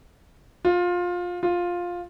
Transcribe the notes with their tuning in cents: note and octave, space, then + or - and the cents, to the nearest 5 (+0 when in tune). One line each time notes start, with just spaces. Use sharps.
F4 +20
F4 +10